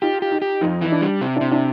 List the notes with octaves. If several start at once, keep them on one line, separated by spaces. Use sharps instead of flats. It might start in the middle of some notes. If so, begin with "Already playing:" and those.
D#4 F4 G4
G4
D#4
G4
F2 D#4
E3
D4
G3
C3
C3 D4 E4
D4 E4